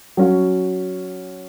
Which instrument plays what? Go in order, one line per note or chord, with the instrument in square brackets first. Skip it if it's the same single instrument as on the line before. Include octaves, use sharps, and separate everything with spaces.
[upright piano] F#3 C#4 F#4